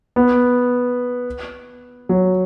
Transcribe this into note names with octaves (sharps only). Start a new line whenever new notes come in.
B3
F#3